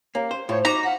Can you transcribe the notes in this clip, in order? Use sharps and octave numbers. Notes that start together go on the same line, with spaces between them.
A#3 C#4 G4
C5
A2 F4 C5 C#5
D#4 F#4 A#5 D6
F5 F#5 B6